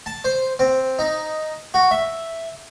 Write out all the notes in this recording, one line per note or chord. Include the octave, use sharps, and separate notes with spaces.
A5
C5
C4
D#4
F#4
E5